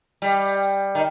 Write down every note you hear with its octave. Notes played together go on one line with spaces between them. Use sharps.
G3
D#3